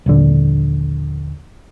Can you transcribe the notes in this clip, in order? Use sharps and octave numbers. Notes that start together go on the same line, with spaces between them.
D#1 A#1 D3